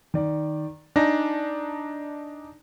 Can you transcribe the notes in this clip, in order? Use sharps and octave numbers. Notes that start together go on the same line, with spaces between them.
D#3 D5
D4 D#4 G#5 A#6